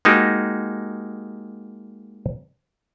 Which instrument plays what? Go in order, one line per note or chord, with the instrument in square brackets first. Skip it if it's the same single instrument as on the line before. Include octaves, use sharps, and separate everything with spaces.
[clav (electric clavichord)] G#3 A#3 D#4 F#4 G4